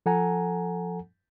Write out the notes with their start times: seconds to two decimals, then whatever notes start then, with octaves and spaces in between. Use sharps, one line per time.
0.06 F3 A4 F#5 G#5 A#5